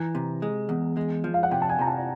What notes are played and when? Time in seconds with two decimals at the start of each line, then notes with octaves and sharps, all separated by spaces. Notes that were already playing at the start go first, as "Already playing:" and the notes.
Already playing: E3 A#5
0.15 C3
0.42 G#3
0.69 E2
0.97 G#3
1.24 F3
1.34 F5
1.43 F#5
1.51 C3 G5
1.62 A5
1.69 G#5
1.79 C3 A#5
1.88 A5